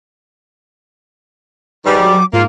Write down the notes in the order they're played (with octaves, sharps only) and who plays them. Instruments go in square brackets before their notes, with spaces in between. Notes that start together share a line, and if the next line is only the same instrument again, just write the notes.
[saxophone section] G#2 D#3 G3 [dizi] B4
[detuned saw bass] F#3 [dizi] D6
[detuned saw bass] G#2 [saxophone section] A#3 [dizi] F4